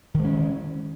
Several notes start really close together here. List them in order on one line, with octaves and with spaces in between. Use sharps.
D#3 G#3 C#4